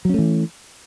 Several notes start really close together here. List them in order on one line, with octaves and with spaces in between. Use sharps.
F#3 C#4 A3 E3